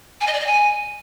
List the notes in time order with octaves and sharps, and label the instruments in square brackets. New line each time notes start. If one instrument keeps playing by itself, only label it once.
[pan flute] G#5
D#5
D5
D#5
G#5